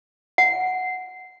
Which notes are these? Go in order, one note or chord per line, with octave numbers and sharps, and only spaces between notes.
F#5